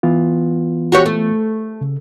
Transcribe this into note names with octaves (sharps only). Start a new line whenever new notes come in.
E3 B3 F4
F#4 G4 C#5
A3
C#3